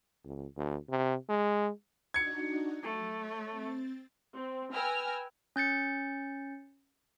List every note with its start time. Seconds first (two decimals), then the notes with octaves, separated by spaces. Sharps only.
0.25 C#2
0.56 D2
0.90 C3
1.29 G#3
2.14 D4 D#4 F#4 G#6 C#7
2.83 F#3 A3
3.15 C#5
3.50 C4 A6
4.34 C4
4.73 B4 G5 G#5 E6 F6 A#6
5.56 C#4 G6 A6 C#7